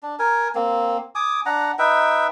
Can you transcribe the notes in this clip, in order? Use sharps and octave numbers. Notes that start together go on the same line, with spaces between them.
D4
A#4 G#5
A#3 C4
G#5 D6 D#6
D4 F#5 A#5
D#4 B4 E5 G5